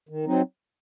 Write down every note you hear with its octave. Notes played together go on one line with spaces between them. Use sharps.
D#3
F#3 C4 D#4